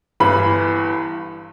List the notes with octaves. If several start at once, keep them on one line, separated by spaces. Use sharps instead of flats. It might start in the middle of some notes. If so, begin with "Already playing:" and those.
G1 G2 E3 B5